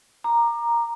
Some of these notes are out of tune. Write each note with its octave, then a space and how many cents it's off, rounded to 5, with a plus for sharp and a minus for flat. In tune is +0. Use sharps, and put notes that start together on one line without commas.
A#5 +0 D6 +30